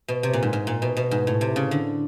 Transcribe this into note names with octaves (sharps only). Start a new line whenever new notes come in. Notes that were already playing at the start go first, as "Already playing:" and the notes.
B2
C3
A#2
G#2
G#2
A#2
B2
B2
G#2
A2
C3
C#3
D3